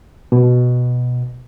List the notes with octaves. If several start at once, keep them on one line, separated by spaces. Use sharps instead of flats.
B2